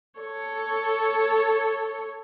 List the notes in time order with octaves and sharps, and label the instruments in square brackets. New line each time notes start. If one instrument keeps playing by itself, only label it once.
[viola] A4 C#5